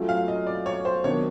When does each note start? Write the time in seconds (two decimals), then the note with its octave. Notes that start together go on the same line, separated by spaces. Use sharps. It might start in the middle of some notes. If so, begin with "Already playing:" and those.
Already playing: F#3 A3 C#4 F4
0.09 F5
0.28 D#5
0.47 D5
0.66 C#5
0.85 C5
1.04 C3 D#3 F#3 B3 D4 C#5